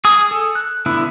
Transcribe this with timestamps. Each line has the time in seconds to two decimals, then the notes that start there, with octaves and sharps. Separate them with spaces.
0.05 G#4 D#6
0.31 A4
0.55 F#6
0.86 D3 B3 E4